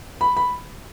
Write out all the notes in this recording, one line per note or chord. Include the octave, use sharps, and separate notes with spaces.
B5
B5